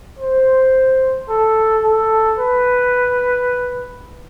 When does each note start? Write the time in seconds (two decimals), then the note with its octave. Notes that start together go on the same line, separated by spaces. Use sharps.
0.19 C5
1.29 A4
1.84 A4
2.39 B4